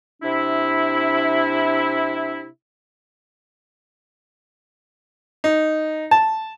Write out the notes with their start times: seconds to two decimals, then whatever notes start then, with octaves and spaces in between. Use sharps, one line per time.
0.22 C3 D4 E4
5.44 D#4
6.11 A5